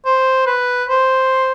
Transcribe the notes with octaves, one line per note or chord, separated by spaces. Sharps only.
C5
B4
C5